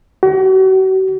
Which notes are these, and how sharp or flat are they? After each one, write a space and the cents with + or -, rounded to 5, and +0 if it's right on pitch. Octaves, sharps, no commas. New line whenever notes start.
F#4 +40